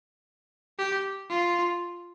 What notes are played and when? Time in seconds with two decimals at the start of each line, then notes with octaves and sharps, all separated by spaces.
0.78 G4
1.30 F4